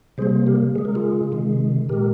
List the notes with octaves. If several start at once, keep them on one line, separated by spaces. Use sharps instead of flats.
C3 G3 A#3 G#4 C5
G4 A#4
C#3 G#3 G#4
A#4
F4 G#4
C3 D#3 G#3
A#2 G#3 G4 A#4